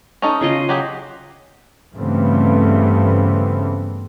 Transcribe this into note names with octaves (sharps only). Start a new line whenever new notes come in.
C#4 D#4 A4
C#3 F4 D#5
F#3 G4 G#4
G2 C#3 E3 A3 B3 C4